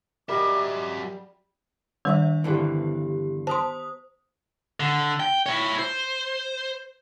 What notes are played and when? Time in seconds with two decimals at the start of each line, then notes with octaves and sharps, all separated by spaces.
0.29 F#3 G3 A#4 D#5 E5 D6
2.05 D#3 G3 D4 C5 E5
2.44 G2 D3 E3 B3 G4
3.47 C5 A5 C6 D#6
4.80 D3
5.20 G5
5.46 E4 C#5
5.79 C5